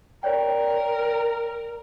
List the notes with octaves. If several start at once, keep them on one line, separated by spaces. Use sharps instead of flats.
A#4 C#5 D5 G5